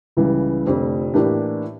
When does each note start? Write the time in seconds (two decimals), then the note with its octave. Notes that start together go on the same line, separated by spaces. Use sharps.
0.17 C#2 C#3 E3 G3
0.65 F1 F2 D3 A3
1.14 A2 E3 A#3 D4 G4